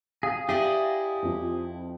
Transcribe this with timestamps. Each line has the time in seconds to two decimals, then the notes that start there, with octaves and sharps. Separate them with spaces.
0.23 G#4 F5 G5
0.49 E4 G4 G#4 D5 D#5
1.22 F2 F3 C4